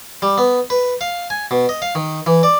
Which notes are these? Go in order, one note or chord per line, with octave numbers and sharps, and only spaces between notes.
G3
B3
B4
F5
G#5
B2
D#5
F5
D#3
E3
D5